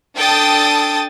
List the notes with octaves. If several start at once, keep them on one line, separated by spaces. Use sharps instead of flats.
D4 A4 G5 A5 D#6 A6